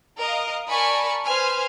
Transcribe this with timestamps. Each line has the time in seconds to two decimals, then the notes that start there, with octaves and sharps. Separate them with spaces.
0.19 A#4 D#5 F5
0.69 A#4 D5 G#5 A5 B5 C#6
1.26 B4 C5 G#5 F6